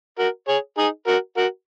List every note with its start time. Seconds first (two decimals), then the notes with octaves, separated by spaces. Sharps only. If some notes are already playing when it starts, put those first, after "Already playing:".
0.19 F#4 A#4
0.48 G#4 C#5
0.78 D#4 G#4
1.07 F#4 A#4
1.37 F#4 A#4